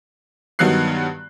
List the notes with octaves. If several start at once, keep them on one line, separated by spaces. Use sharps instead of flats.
G2 D#3 F#3 B3 F#6 C7